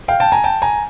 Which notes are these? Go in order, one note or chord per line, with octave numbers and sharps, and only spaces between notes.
F5 G5
G5 A5
G#5 A#5
G5 A5
G#5 A#5